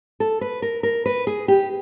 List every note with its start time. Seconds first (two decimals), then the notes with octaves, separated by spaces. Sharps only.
0.20 A4
0.41 B4
0.62 A#4
0.83 A#4
1.06 B4
1.27 G#4
1.48 G4